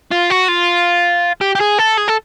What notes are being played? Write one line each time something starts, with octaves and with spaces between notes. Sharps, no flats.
F4
F#4
F4
G4
G4
G#4
A4
G#4
A4